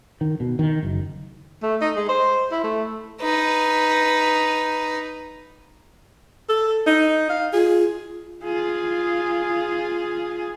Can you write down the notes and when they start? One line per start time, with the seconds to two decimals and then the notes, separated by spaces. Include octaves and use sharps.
0.21 D#3
0.40 B2
0.59 D#3
0.83 F#1
1.63 A3
1.81 D#4
1.96 G#3
2.09 C5
2.52 E4
2.64 A3
3.22 D#4 B4
6.49 A4
6.87 D#4
7.29 F5
7.53 F4 G#4
8.44 F4 G#4